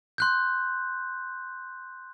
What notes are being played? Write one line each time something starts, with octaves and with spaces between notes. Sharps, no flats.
C6 F#6 G6